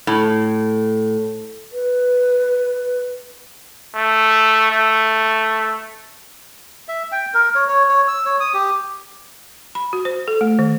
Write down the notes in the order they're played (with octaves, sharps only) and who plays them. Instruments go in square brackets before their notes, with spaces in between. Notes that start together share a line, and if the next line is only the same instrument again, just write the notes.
[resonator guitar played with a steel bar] A2
[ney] B4
[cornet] A3
A3
[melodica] E5
G5
A#4
C#5
C#5
C#5
E6
C#5
D#6
G4
[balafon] B5
F#4
C5
A4
A3
D#3